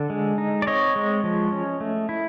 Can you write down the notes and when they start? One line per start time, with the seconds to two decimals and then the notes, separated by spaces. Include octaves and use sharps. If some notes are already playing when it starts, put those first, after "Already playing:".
Already playing: D3 A4
0.10 G#3
0.38 D#4
0.62 D5
0.67 C4 C#5 D#5
0.96 G#3
1.24 F3
1.52 C#4
1.81 A3
2.09 E4